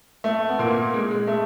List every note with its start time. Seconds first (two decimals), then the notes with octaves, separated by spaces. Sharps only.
0.24 A3
0.49 B3
0.59 A#2 A#3
0.94 G#3
1.11 G#3
1.27 A3